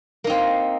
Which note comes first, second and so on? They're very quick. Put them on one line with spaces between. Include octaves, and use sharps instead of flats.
A#3 D#4 C4